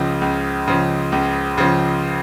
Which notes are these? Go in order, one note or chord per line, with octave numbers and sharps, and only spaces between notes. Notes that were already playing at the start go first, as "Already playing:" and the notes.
Already playing: C#2 C#3 F3
C#2
C#3 F3
C#2
C#3 F3